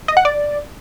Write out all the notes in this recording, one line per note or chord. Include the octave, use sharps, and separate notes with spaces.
D#5
F#5
D5